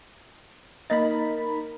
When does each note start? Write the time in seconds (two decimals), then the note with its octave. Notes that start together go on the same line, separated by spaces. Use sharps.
0.90 A#3 D#4 A#4 D#5 B5 A6